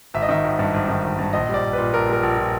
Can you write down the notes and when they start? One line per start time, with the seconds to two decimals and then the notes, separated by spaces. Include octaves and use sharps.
0.14 G#1 E5
0.22 D#5
0.29 D#3 E5
0.44 G#1
0.59 G2
0.74 G#1
0.89 D#3
1.04 G#1
1.19 G2
1.33 A#1 D#5
1.49 G3
1.54 D5
1.64 A#1
1.73 A#2 B4
1.93 A#1 A#4
2.08 G3 A#4
2.23 A#1
2.38 A#2